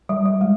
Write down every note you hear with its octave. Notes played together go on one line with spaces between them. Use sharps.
G3
G3
G#3